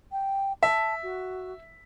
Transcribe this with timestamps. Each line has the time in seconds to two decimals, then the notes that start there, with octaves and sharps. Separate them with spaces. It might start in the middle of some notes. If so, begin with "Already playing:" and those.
0.12 G5
0.63 E5 A5
1.03 F#4